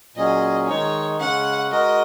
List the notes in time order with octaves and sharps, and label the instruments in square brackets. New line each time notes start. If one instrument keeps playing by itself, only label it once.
[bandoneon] A#2 F#3 C#4 G#4 [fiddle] D#5
[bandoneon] D#3 G#3 D#4 [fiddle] C#5
[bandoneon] C#3 G#3 C#4 [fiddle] F#5
[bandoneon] G#3 F#4 A#4 [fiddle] D#5